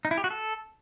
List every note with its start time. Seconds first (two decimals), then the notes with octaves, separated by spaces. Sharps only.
0.05 D#4
0.11 E4
0.18 G4
0.24 F#4
0.30 A4